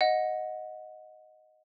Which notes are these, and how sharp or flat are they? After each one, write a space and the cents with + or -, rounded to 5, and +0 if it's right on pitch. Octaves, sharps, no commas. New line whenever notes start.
D#5 +0 F#5 -15